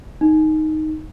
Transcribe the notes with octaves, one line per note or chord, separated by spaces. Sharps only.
D#4